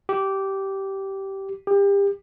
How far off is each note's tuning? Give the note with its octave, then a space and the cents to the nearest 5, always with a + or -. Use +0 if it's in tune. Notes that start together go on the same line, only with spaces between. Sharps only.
G4 -15
G4 +30